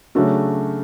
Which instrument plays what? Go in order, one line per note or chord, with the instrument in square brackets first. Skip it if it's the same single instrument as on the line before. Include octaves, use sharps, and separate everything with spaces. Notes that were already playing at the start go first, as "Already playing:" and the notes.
[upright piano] C#3 F#3 A3 D4 F#4